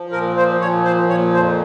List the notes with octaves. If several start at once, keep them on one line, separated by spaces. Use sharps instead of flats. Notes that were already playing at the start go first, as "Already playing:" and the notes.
Already playing: F3
A#2 A#4
F3 C5
A#2 C#5
F3 C5
A#2 C#5
F2 C5